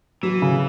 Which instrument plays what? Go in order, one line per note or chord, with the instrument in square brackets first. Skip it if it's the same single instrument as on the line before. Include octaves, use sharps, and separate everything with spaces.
[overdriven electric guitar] E3 [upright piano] F#3
[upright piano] C#3